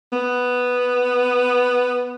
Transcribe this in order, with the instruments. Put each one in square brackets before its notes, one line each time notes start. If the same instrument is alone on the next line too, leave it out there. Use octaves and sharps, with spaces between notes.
[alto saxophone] B3